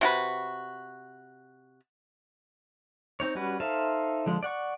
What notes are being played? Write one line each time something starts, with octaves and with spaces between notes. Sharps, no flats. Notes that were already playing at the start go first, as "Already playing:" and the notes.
C3 F#4 B4
C4 D#4 C#5
G3 C#4 F#4 B4
D#4 A4 C5 E5 F5
D3 F3 G#3
D5 F#5 C#6